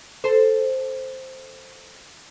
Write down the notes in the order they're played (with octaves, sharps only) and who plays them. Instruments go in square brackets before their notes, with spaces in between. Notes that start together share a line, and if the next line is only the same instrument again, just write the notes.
[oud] A4 C5